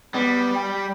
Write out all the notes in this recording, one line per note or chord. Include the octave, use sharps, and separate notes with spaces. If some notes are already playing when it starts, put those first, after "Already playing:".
G3 B3
G5